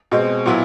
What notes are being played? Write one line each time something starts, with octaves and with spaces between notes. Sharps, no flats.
B2 G#3 C4
A#2 F#3 B3 E4